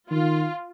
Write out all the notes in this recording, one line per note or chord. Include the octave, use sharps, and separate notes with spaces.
D#3 F4